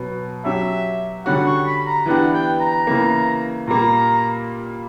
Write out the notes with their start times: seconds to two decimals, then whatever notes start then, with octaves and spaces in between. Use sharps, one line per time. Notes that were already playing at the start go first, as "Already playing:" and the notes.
Already playing: B2 F#3 B3 F#4
0.45 F#3 C#4 G4 E5
1.26 D3 G3 C#4 F#4 F#5
1.46 C#6
1.66 B5
1.86 A#5
2.06 E3 B3 D4 G4 F#5
2.33 G5
2.61 A#5
2.87 C#3 E3 A#3
3.68 A#2 G3 A#3 A#5